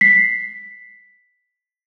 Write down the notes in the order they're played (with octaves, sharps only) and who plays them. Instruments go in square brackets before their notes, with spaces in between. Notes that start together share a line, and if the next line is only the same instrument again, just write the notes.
[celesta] B6 C7